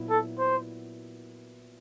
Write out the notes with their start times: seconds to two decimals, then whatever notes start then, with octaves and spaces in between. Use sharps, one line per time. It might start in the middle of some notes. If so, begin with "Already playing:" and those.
Already playing: A#2 F#3 B3 E4
0.09 A4
0.38 C5